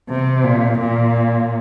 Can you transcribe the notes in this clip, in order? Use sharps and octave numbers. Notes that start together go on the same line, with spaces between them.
C3
A#2
A#2